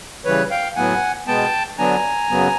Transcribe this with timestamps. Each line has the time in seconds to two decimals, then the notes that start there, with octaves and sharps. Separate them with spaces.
0.25 C#3 E3 G3 B4 C#5
0.50 F5 G5
0.76 A2 F#3 B3 F#5 G#5
1.27 B2 G#3 B3 G5 A5
1.78 D3 F#3 B3 D4 G#5 A#5
2.30 F#2 C#3 F#3 B3